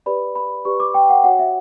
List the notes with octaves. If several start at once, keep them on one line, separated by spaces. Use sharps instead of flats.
G4 B4 D5 B5
B5
G4 B4 D5 C#6
D6
G5
F#5
F#4 C#5 F#5
E5